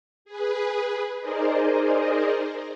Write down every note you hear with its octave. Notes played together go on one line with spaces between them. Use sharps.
G#4 B4
D#4 G#4 A#4 C5 D5 D#5